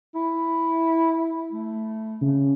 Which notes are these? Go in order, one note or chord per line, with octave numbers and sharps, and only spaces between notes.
E4
A3
C#3